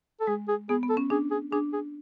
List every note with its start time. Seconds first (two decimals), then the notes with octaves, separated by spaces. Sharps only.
0.20 A4
0.27 G#3 G#4
0.48 G#4
0.69 B3 G#4
0.83 B3
0.89 A4
0.97 C#4
1.10 D4 G#4
1.31 G#4
1.52 D4 G#4
1.73 G#4